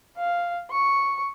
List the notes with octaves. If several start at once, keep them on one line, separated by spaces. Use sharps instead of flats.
F5
C#6